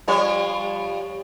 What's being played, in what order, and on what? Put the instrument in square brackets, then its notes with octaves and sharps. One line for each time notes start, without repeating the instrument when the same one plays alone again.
[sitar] F3 G3 C#5